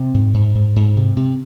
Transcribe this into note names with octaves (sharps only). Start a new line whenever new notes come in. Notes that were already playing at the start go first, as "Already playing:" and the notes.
Already playing: C3 C4
G#2
G#2
G#2
G#2
C3
C3